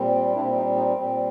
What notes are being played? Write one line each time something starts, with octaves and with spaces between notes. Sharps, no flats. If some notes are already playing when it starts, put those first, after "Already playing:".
Already playing: A#2 G3 C4
A#2 G3 C4 D4 E4
D#4
D#4
A#2 G3 C4